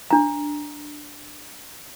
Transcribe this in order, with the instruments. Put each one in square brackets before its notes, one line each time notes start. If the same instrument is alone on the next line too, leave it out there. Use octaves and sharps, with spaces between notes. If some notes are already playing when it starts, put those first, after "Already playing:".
[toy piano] D4 A#5